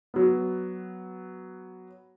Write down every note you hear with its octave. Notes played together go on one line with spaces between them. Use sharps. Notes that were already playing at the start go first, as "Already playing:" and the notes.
F#3 B3